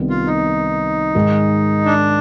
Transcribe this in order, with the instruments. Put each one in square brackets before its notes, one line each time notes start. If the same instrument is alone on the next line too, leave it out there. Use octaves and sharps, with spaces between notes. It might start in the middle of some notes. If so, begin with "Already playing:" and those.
Already playing: [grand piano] C2 C3 D#3 B3
[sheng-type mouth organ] F4
D#4
[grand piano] G#2 D#3 G#3
[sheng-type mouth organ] D4